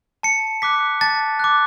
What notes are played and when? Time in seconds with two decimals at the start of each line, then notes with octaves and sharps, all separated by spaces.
0.23 A5 C#7
0.62 D6 F#6 B6
1.01 A5 A6
1.39 D6 F#6